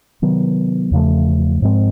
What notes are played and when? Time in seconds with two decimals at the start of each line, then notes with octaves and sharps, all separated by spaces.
0.22 C3 D#3 F#3 B3
0.91 E2 C#3 F3 A3
1.62 G#2 F3 G#3 C4